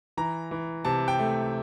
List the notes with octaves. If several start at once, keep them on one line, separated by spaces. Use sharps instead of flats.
E3 A#5
E3
C3 A5
G5
A3